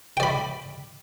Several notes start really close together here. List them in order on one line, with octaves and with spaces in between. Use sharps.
G5 D5 B5